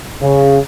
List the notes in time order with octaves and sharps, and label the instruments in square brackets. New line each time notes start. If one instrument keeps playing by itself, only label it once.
[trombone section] C#3